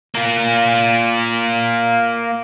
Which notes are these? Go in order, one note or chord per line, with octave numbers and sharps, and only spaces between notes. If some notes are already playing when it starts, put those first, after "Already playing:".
A#3 F4